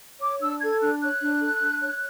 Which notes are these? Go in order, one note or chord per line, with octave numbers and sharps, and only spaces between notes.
C#5 D6
D4 E6
A4 G#6
D4 F#6
C#5 F#6
D4
A4
D4
C#5